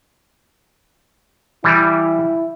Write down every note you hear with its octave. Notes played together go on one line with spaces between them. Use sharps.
E3 G3 E4